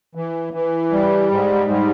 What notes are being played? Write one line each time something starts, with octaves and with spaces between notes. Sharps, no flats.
E3
E3
G3
G#2
G3